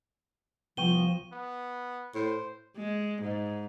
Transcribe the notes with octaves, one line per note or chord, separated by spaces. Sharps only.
C2 F3 B3 G5 C#6 D#7 G7
B3
A2 C5
G#3
G#2